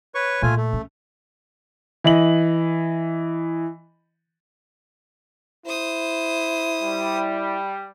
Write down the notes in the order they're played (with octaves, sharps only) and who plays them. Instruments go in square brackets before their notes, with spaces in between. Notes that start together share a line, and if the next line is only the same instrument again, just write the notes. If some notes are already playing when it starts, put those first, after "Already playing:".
[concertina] B4 C#5 C#6
[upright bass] A#2 [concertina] A3 F4 G#5
[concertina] A3
[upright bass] C#4
[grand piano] E3 D#5 F#7
[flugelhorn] E4 [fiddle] C5 D#6
[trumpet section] G3